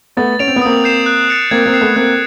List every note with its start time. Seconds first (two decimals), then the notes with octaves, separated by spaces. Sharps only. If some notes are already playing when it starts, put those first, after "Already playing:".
0.17 A3 B3 A6
0.39 C#4 D7 F7
0.48 C4
0.56 B3
0.62 A#3 C4 D#6
0.84 G6 C7 E7
1.06 F#6
1.29 A6 C#7 F7
1.51 A#3 C4 G#6
1.66 A#3 C4
1.74 C7 E7
1.81 A3 B3
1.96 A#3 C4 F#6